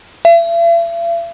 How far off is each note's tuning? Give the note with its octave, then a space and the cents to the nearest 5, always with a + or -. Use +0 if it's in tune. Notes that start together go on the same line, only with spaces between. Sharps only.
E5 +45